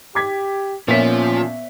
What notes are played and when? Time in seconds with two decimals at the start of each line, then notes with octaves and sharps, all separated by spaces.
0.15 G4 D6 G#6 B6
0.88 A#2 F3 B3 C#4 C#5 E5 B6